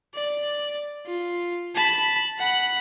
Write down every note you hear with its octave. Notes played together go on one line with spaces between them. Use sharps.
D5
F4
A5 B5
F#5 B5